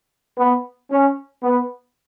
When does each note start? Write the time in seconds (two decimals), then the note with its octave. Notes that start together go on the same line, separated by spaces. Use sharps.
0.37 B3
0.91 C#4
1.43 B3